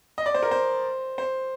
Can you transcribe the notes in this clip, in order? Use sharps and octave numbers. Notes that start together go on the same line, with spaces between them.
D#5
D5
C5
A#4
C5
C5